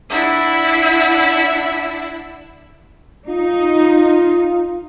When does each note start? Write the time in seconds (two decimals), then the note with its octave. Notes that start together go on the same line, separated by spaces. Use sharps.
0.10 D4 E4 E5 F#5
3.29 D#4 F4